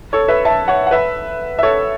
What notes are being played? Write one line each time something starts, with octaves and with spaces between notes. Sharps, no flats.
A4 C#5
B4 E5
E5 A5
C#5 F#5
F#5
B4 E5
E5
A4 C#5